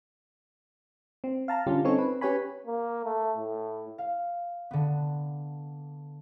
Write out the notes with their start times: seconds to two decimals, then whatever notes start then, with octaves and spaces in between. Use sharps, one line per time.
1.24 C4
1.48 F5 A5 A#5
1.67 D3 G3 C#4 F4 G4
1.85 C4 C#4 D#4 A4 C#5
1.98 C4 B4
2.21 C#4 G4 B4 C#5 G#5 B5
2.66 A#3
3.05 A3
3.38 A2
3.98 F5
4.71 D3 B3